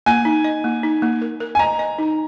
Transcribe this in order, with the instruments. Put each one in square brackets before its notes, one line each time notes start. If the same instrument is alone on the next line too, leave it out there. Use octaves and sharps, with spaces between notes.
[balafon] A#3 [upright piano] G#5
[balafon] D#4
D#5
A#3
D#4
A#3
A#4
A#4
[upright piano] G#5
[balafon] D#5 [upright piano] A#5
[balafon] D#5
D#4